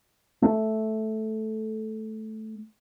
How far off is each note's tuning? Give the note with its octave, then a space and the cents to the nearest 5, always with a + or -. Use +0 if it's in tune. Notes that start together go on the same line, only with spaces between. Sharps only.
A3 -10